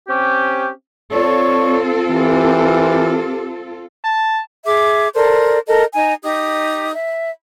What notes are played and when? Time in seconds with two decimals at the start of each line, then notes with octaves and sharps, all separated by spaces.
0.08 C4 C#4 G4
1.12 C4 F4 A4 C#5 D5 C#6
2.11 E3 G4 A#4
4.04 A5
4.66 G#4 E5 D6
5.15 A4 A#4 C5 D5
5.67 A4 A#4 D#5
5.94 D#4 G#5 A#5
6.22 D#4 G4 D#6
6.94 E5